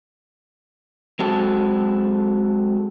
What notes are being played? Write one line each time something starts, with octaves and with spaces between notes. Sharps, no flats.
F#3 G#3 C4 F#4 A4